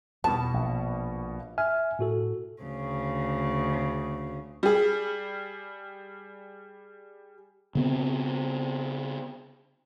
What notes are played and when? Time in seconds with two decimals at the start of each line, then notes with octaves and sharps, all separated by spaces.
0.24 E2 B2 G3 B3 A5
0.54 A#1
1.58 E5 G#5 F6
1.99 A2 F#4 A4
2.62 D2 C#3
4.63 G3 G#4
7.75 C#3 B3 C4